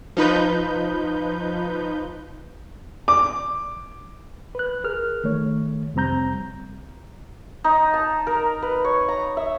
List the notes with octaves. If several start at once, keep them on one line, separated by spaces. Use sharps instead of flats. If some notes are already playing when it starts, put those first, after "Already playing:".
F3 D#4 B4 G6
D6
B4 F#6
G#4 A#4 F6
D#3 A3 C#5
F2 C3 G3 C4 A#5 G6
D#4
A5
A#4
B4
C#5
A#5
E5